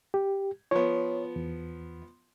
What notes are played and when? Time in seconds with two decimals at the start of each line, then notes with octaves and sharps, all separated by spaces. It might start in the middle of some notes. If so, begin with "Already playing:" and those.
0.14 G4
0.71 F3 B3 C#5
1.36 E2